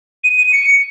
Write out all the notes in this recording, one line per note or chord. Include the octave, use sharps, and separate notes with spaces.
D#7
D#7
C#7